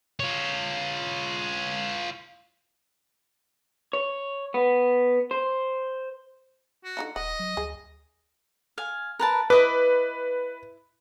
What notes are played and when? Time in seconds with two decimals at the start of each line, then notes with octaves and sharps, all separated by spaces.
0.20 F4 C#5
3.93 C#5
4.54 B3
5.31 C5
6.84 F#4
6.97 D3 D#4 F4
7.16 D#1 D#5 F#5
7.39 F#3
7.57 D2 G#4
8.78 F5 G#5
9.19 A#4 B4 A5
9.50 E4 B4 D#5 D6